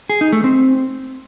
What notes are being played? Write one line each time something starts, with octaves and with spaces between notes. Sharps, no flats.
G#4
D#4
A3
C4